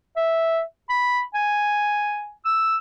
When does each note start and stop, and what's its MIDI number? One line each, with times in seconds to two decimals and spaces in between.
0.16 0.60 76
0.89 1.20 83
1.34 2.31 80
2.45 2.76 88